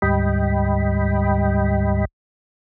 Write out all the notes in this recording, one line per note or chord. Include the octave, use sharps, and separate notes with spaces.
D2 G#2 G3 D#5 G5 B5